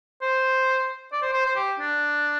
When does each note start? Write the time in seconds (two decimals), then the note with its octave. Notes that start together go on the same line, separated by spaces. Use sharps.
0.22 C5
1.12 D5
1.22 C5
1.34 C5
1.46 C5
1.56 G4
1.79 D4